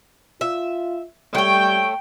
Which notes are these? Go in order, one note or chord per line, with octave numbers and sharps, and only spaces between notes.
F4 E5
G3 A3 C#5 G5